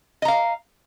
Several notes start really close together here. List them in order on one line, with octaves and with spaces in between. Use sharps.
D#5 A#5 F5